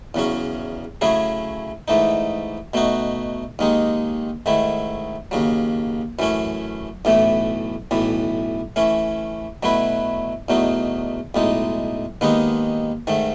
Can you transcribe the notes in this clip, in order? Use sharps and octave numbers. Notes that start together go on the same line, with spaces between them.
E2 C#3 F#3 C#4
C#3 F#3 A3 E4 G#4
G#2 E3 A3 D#4
B2 A3 D#4 F#4
D#2 D#3 G#3 D#4
G#2 D#3 A3 E4
D#2 C#3 F#3
F#2 E3 A3 C#4
B1 A2 E3 A3
B1 A2 E3
E3 A3 C#4
B2 F#3 A3 E4 B4
E2 B2 F#3 A3 D#4
B1 A2 G#3 D#4
D#2 D#3 G#3 B3 D#4
G#2 D#3 A3